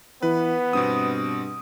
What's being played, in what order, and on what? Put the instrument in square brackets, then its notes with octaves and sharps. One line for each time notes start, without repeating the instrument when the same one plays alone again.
[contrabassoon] E3 [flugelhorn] B3 [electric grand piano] B4
[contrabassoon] G2 [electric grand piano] B2 C4 D#6